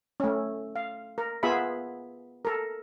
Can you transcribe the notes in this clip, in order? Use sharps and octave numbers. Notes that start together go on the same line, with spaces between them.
A3 C#4
F5
A#4
B3 F4 G#4 E5 B5
A4 A#4